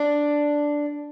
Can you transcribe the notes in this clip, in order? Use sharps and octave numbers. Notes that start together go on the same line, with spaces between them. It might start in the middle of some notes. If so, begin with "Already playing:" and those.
Already playing: D4